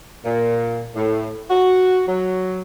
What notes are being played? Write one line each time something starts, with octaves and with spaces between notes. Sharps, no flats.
A#2
A2
F#4
F#3